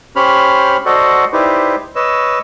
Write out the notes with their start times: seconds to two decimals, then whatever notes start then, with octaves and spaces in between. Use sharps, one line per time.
0.16 C#4 G4 C5 C#5 B5 F6
0.86 F#4 A4 C5 D5 D#5 F#5
1.33 D#4 E4 G4 B4 C5 D5
1.95 B4 C#5 D#5 E6